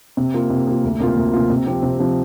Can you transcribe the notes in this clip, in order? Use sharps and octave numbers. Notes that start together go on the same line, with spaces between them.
C3
A#3 F4
C3
A#3 F4
D2
C3 A#3 F4
D2
C3 A#3 F4
C3
F3 C4 G4
C3
F3 C4 G4